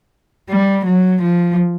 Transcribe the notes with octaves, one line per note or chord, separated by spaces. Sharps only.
G3
F#3
F3